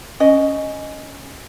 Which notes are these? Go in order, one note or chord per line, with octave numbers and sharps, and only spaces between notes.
C#4 D#5